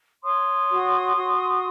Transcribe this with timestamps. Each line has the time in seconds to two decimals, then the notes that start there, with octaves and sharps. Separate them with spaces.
0.24 C#5 C6 D#6
0.70 F#4
1.16 F#4